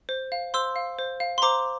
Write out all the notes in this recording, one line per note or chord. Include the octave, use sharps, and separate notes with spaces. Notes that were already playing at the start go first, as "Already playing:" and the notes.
C5
F5
C5 C6 E6
F5
C5
F5
C6
C5 A#5 D6